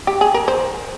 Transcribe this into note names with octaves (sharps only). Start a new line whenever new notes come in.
G4
G#4
A#4
C5